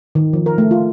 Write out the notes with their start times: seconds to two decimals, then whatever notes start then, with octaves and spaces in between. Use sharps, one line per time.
0.15 D#3
0.33 F3
0.46 A#4
0.58 A3
0.71 F4